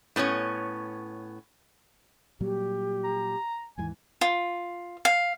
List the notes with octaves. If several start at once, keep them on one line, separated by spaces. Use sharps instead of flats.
A2 B3 C#4 C#5
A#2 F#3 G3 G4
A#5
D#2 G#2 E3 G#5
F4
F5